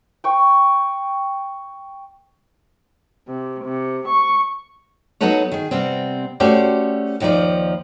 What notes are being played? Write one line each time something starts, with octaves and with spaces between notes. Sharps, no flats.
G5 C#6
C3
C3
C#6
F#3 B3 D#4 A4 B4 C#5
D#3 G#4
C3 G3 B3 C4
A3 C#4 F#4 G4 C5 D5
D#2 D#3 F3 D#4 D5